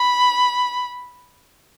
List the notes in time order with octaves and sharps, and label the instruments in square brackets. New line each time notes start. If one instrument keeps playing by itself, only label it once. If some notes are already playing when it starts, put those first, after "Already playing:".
Already playing: [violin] B5